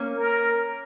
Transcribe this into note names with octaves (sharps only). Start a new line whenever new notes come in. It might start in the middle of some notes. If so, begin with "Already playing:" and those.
Already playing: A#3 C#4
A#4